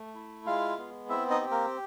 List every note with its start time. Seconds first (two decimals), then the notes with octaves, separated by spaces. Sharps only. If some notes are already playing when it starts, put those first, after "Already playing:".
Already playing: A3
0.14 E4
0.46 G#3 F4 F5
0.78 B3
1.09 C4 E4 E5
1.30 D#4 D#5
1.41 G4
1.51 A#3 A#4